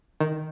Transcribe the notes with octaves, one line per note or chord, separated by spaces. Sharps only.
D#3